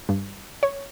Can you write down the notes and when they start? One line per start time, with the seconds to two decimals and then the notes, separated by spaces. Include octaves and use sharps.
0.09 G2
0.63 C#5